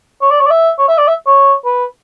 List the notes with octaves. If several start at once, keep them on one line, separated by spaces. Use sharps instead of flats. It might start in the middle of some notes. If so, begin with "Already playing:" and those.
C#5
D5
C#5
D5
E5
C#5
E5
D5
E5
C#5
B4